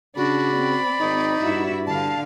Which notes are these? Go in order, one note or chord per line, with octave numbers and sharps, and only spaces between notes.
C#3 D4 F#4 D5 B5
C4
G#1 D#4
G2 E4 F#4 E5
D3 F5 A5